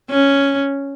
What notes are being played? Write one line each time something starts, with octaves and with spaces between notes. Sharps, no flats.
C#4